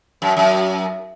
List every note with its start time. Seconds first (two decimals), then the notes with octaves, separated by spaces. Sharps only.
0.22 F#2
0.37 F#2